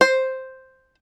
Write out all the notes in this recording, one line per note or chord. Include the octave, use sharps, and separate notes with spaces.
C5